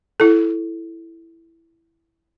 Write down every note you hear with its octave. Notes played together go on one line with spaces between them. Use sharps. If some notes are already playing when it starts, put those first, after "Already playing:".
E4 A4